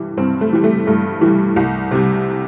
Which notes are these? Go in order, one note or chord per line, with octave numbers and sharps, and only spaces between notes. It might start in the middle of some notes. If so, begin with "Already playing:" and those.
Already playing: G2 E3 G3
G2 C4
A3
E3 G3
A3
G2 A3
E3 G3
C2
C3 G3